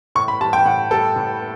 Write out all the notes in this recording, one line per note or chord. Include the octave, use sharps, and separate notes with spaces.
A2 C#6
B5
G3 A5
G5
A2 F#5
G3 A4
A2